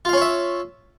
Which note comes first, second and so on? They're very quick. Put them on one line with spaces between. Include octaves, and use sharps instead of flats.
F4 F5 C#4 C#5 E5